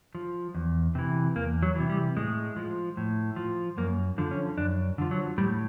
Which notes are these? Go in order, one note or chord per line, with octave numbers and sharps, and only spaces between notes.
F3
E2
C3 E3
E2 A#3
F#3
C3 E3
G3
A2 G#3
F3
A2
F3
F#2 A#3
D3 F3
C#4
F#2 D4
D3 F3
F#3
A2 G3